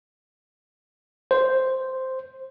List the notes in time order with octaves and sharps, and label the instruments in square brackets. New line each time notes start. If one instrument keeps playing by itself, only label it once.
[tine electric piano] C5